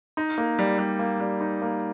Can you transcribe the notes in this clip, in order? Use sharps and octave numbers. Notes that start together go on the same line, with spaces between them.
D#4
A#3
G3
G3
A#3
G3
D#4
A#3